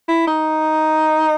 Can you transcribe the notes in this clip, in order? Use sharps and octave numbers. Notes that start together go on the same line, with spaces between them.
E4
D#4